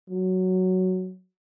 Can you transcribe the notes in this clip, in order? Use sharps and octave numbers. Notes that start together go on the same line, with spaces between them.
F#3